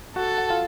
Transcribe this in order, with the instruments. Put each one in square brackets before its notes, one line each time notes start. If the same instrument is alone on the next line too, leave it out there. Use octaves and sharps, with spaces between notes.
[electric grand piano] F#4 F#5 [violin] A4
[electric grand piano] F#5
F4 F5